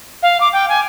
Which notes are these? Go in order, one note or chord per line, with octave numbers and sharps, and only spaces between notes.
F5
D6
G5
G#5